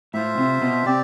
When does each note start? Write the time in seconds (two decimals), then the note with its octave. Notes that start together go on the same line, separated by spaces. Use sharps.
0.14 A2 F4 C5 E5
0.38 C3
0.62 B2
0.86 C3 C4 G4 D5